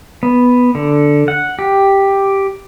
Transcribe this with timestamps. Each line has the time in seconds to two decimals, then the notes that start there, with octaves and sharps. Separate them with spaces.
0.23 B3
0.75 D3
1.28 F#5
1.59 G4